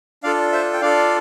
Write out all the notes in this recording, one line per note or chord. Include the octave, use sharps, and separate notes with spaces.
D4 F4 A4 D5 F5
C5 E5
G5
D4 F4 A4 D5 F5